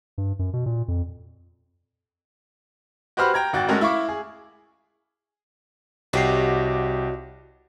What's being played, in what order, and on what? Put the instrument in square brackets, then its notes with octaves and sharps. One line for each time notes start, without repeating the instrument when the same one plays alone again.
[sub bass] G2
F#2
B2
A#2
F2
[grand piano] F#4 G4 B4 C5 B5 F6
G5 A#5 G#6
G#1 F#4 G5 A6
G#3 A3 C#4 F#4 A#4
E4 E5 F5 C#6 D6
G#4
[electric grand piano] C2 G4 C7 [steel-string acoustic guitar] F#4 C#5 D#5